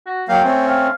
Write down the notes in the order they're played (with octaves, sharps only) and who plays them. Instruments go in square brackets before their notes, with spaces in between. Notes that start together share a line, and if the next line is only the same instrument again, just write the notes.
[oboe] F#4
[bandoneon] F#3 A#3 F5 [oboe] G5
[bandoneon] A3 C4 C#4
[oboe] F5